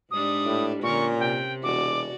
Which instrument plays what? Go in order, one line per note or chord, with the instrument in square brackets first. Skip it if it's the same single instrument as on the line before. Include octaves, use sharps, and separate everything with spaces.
[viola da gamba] G#2 G3 D4 [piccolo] D#6
[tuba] A2
[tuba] A#2 [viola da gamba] D3 C#4 A#4 [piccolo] C#6
[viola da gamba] C3 [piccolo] G5
[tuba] E1 [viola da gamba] F#4 D5 [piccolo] D6